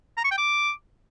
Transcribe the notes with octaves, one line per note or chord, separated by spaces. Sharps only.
A#5
C#6
G5
D6